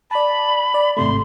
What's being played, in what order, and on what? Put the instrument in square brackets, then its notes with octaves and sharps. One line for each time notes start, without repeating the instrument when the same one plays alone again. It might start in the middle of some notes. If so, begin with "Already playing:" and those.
[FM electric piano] D5 A5 [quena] B5
[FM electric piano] D5
[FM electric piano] G#1 C3 A3 [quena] C6